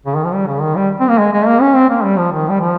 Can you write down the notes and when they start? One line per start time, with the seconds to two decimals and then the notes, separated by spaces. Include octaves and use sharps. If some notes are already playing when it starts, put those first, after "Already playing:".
0.06 C#3
0.16 D#3
0.24 F3
0.33 G3
0.47 C#3
0.62 D#3
0.76 G3
1.00 C4
1.09 A#3
1.19 G#3
1.33 G#3
1.47 A#3
1.61 C#4
1.76 C4
1.89 A#3
2.04 G3
2.18 F3
2.32 D#3
2.50 G3
2.60 F3